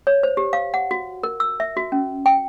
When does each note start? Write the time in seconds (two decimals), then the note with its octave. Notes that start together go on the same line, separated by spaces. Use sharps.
0.07 C#5
0.23 C5
0.37 G4
0.53 F5
0.74 F#5
0.91 F#4
1.23 A#4
1.40 E6
1.60 E5
1.77 F#4
1.92 C#4
2.26 G5